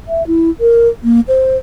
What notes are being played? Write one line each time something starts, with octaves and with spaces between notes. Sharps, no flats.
E5
E4
A#4
A#3
C5